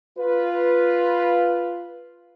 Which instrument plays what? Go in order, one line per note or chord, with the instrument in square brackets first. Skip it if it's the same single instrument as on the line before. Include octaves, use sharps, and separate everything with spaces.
[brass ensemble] F4 B4